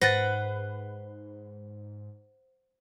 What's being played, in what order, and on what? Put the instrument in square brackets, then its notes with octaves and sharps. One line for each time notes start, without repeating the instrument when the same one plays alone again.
[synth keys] G#2 [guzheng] B4 F#5 [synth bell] C5 [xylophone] A6 A#6